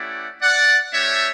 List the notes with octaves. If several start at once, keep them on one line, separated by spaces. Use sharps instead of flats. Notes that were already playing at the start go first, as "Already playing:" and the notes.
Already playing: A3 C#4 E4 G4 D5 F#5
D5 F#5
A3 D4 G4 C#5 E5